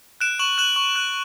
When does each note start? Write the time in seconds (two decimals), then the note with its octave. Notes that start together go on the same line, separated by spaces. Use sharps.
0.21 F#6 D7 E7
0.39 C#6 E7 F#7
0.58 F#6 E7 F#7
0.76 C#6
0.96 F#6